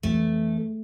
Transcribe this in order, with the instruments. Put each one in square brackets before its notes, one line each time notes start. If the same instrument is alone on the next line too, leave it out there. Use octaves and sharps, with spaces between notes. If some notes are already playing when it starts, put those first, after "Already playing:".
[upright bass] F2 E3 [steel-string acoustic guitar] A3